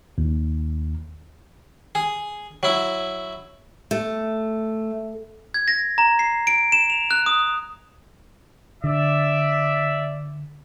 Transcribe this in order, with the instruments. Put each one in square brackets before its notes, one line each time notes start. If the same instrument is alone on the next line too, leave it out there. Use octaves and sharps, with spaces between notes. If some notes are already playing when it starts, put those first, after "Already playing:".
[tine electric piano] D#2
[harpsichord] G#4
F#3 E4
[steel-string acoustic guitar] A3
[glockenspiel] G#6
A#6
A#5
C7
D7
E7
F7
F#6
D#6
[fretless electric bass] D3 [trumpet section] D5 E5